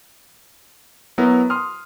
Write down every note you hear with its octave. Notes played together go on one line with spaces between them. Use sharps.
F#3 B3 E4 A#4
C6 D#6 F6